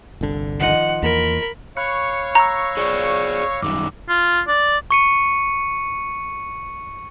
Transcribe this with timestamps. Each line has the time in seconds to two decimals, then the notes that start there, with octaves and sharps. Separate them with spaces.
0.21 G1 C2 D3
0.60 D#3 F3 D#5 F#5
1.03 E2 A#3 A#4 B5
1.77 C#5 F5 B5 C#6 F#6 C#7
2.35 A#5 E6 A#6
2.77 G#4 C5 D5
3.62 F#2 D#3 G3 D6
4.08 F4
4.48 D5
4.91 C#6 C#7 D#7